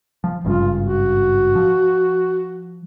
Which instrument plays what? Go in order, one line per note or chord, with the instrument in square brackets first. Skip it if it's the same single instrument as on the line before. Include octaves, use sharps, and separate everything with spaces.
[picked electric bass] F3
[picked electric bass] G#1 G2 C#3 [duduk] F4
[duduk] F#4
[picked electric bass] F3